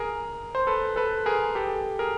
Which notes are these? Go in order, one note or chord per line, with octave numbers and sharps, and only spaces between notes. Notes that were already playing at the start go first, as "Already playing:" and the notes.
Already playing: G#4 A#4
C5
A4 B4
A4 B4
G#4 A#4
G4 A4
G#4 A#4